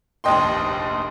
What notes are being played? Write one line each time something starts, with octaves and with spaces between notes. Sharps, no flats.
F1 A#1 D#2 D#5 G5 C6